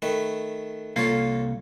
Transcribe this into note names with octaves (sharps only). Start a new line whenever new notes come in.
D#3 A3 B4
C2 A#3 F4 A4 C#5 F5